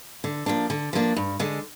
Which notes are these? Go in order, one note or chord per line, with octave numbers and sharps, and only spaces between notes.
D3
F3 A#3 D4
D3
F3 A#3 D4
G2
D3 G#3